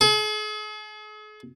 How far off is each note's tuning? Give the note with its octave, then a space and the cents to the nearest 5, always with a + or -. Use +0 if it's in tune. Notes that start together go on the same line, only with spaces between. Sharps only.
G#4 +45